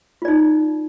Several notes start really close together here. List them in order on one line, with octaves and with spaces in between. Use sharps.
F4 D5 D#4